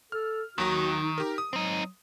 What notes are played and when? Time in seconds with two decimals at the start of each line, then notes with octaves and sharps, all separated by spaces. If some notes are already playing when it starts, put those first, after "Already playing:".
0.12 A4 F6
0.58 D#2 D#3 F#3 F#4 A#5
1.01 D#4
1.18 G4 A#4
1.38 D#6
1.53 F#3 C4 D#4